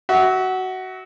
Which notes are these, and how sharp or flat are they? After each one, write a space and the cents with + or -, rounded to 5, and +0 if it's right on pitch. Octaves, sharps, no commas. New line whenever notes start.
F#4 +15 E5 -25